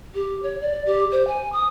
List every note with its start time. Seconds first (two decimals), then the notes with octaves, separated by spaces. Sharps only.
0.14 G4
0.42 C#5
0.61 D5
0.86 G4
1.11 C5
1.27 G#5
1.52 D#6